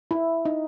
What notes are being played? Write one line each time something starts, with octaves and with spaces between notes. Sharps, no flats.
E4
D#4